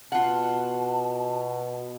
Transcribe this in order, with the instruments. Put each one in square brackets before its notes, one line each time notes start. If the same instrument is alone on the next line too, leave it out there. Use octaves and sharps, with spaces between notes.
[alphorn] B2 [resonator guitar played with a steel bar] F4 F#5 [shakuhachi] A5